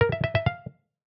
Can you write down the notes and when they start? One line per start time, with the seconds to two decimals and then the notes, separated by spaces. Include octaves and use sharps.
0.01 A#4
0.12 E5
0.24 E5
0.35 E5
0.46 F5